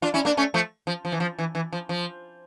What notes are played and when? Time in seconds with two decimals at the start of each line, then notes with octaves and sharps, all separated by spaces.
0.02 D4 F4
0.14 C#4 E4
0.25 A#3 D4
0.37 A3 C#4
0.54 F3 A3
0.87 F3
1.05 F3
1.12 E3
1.20 F3
1.39 E3
1.55 E3
1.73 F3
1.89 F3